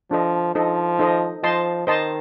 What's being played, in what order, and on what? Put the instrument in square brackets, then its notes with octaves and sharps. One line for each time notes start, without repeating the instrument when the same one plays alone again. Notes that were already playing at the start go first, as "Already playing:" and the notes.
[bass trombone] F3 [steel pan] D4 A4 D#5
[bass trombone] F3 [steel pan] D#4 A4 C5 D#5
[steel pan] D#4 A4 C5 D#5
[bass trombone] F3 [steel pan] C5 D#5 A5 C6
[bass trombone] D#3 [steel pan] C5 D#5 A5 C6